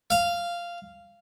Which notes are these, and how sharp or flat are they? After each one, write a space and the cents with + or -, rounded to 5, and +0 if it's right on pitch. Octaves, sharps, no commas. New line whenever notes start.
F5 -10